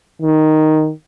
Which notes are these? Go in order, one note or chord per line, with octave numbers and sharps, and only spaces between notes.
D#3